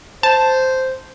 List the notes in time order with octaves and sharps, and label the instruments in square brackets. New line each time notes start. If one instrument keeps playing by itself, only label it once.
[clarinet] C5 [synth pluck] A5